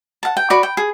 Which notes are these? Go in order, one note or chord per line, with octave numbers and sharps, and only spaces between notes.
F#5 A5
G5
F#4 D5 B5
G5
G#4